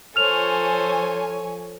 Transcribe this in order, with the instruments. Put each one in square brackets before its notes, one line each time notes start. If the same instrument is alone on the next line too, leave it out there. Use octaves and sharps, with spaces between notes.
[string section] F3 C#5 G#5 [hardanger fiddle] A4 C5 [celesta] F6 F7